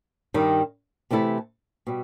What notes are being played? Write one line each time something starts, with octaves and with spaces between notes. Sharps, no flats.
G2 D#3 G3 D#4
C3 E3 A3 E4 A4
B2 G3